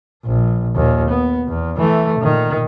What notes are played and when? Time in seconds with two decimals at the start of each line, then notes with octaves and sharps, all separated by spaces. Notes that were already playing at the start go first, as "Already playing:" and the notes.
0.25 A#1
0.75 D#2 A#2
1.10 B3
1.47 E2
1.77 E3 A3
2.20 A#2 D#3